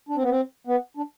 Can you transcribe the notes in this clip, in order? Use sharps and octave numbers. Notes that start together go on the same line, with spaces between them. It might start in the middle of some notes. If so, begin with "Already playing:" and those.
D4
C4
B3
C4
B3
D4